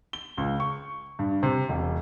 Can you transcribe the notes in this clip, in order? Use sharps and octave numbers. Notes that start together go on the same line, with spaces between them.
G7
C#2
C#6
G2
C3
E1